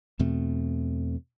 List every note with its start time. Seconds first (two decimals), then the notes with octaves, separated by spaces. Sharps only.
0.19 E2 B2 A3 C4